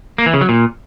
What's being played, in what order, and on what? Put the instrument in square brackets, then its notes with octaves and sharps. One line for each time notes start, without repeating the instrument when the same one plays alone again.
[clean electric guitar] A#3
E3
C#3
F#3
A#2